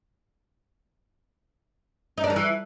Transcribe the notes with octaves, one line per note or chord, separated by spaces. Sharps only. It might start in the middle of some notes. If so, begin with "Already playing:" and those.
D#4
D4
D#3
E3